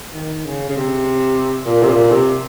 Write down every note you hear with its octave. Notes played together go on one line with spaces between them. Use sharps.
D#3
C#3
C#3
C3
A#2
C3
A#2
C3